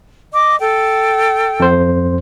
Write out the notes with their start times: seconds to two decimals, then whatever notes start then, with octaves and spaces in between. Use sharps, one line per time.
0.33 D#5 D6
0.61 A4 G5
1.60 F2 C5